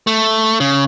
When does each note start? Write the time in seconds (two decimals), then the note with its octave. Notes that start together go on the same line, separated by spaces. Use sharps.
0.07 A3
0.60 C#3